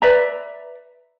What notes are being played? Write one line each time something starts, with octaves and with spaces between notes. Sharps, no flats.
B4 D5 E5 A#5